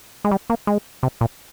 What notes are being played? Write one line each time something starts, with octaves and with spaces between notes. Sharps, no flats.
G#3
G3
A#3
G#3
C3
A#2